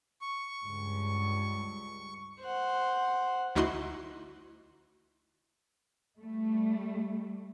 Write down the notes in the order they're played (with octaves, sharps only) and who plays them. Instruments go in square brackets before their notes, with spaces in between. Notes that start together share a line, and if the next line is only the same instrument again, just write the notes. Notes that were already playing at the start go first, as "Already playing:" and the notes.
[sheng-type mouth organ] C#6
[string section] C#2 G2
[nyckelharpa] C5 F#5
[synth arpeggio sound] D2 D#4 E4 F#4 C6
[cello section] G3 A3